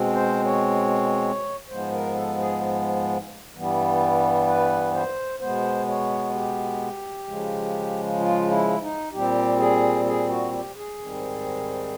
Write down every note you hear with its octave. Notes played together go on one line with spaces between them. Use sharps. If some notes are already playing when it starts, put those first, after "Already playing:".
Already playing: B2 G#3 C4
C5
C#5
G#2 F3 G#3 B3 C5
A#4
A4
G#4
G2 E3 G3 B3
B4
C5
B2 G#3 B3 C5
C#5
G4
C#3 F3 G#3
F4
E4
D#4
A#2 G3 C4 G4
G#4
G#4
F#4
G4
G#4
G#2 D#3 G3 C4